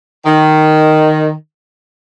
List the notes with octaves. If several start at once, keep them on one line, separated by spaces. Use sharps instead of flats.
D#3